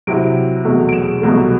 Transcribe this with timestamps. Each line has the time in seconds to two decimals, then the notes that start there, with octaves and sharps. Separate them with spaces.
0.07 C3 F#3 C4 E4 D7
0.64 E2 B2 F#3 A3
0.89 D7
0.93 E7
1.22 C2 B2 F#3 A3